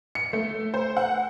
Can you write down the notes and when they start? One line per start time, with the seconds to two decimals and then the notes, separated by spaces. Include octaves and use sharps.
0.15 C#7
0.33 A3
0.74 C5
0.97 F#5